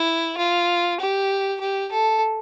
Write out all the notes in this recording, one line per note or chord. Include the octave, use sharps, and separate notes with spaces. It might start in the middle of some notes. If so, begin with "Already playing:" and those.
Already playing: E4
F4
G4
G4
A4